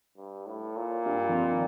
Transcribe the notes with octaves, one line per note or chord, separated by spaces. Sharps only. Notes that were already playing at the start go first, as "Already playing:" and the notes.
G2
A2
A#2
G2 G3
F2 F3
D#3